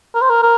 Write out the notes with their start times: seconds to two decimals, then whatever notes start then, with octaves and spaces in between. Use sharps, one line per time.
0.15 A#4
0.22 C5
0.30 A#4
0.43 A#4